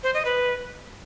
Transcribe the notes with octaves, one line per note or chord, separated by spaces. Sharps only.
C5
D#5
B4